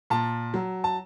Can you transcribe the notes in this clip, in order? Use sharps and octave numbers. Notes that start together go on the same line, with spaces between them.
A#2 A5
F#3
A5